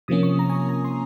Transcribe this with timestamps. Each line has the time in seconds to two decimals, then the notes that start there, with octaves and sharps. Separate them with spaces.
0.08 C3 F3 A#3 C#4 D#6
0.23 C#6
0.39 A#5
0.50 G#5
0.69 A#5
0.85 C6